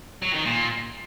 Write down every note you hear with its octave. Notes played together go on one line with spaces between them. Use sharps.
F#3
D#3
A#2